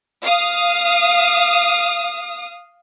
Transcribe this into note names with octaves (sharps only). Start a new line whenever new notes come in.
F5 D#6